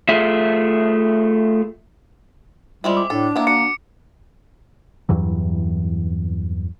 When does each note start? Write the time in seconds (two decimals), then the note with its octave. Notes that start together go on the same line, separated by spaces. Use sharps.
0.09 A3 F4 G#4 E5
2.84 G3 G#3 C4 E4 F4
2.97 D6
3.10 A2 D4 A4
3.36 A#3 B3 E4
3.47 F#4 C#7
5.09 E2 G2 E3 F#3